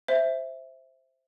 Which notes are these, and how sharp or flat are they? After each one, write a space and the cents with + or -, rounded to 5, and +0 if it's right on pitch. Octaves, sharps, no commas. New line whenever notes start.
C5 +0 E5 +0